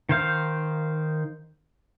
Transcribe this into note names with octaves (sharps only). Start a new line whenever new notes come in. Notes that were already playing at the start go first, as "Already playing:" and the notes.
D#3 C5 F5 G6